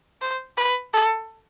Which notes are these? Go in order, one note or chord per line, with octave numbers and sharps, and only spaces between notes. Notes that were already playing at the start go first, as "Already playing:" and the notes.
C5
B4
A4